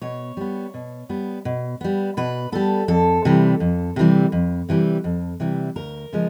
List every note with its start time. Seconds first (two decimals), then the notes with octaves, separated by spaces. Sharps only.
0.02 B2 C#5
0.37 G3 B3
0.74 B2
1.09 G3 B3
1.45 B2
1.81 G3 B3
2.17 B2 B4
2.52 G3 B3 A4
2.88 F2 A4
3.25 C3 E3 G3
3.60 F2
3.96 C3 E3 G3
4.32 F2
4.69 C3 E3 G3
5.04 F2
5.40 C3 E3 G3
5.76 D2 A#4
6.13 C#3 F3 G#3